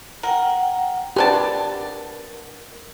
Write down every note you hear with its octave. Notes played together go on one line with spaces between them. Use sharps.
A#4 F#5 G5
B3 D4 G4 A#4 A5